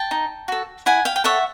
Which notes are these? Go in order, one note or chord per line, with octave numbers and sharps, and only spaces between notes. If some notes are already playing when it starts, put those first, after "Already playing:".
Already playing: G5 A5
D#4
F#4 A4
E4 F#5 G#5
F5 G5
G5
A4 C#5 E5 F#5